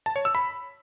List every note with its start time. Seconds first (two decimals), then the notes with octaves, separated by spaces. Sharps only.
0.06 A5
0.16 C#5
0.25 E6
0.35 B5